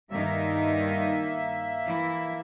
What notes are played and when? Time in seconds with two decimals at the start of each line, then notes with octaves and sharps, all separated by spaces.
0.11 G2 D#3 A#3 D#4 E5
1.84 E3 E4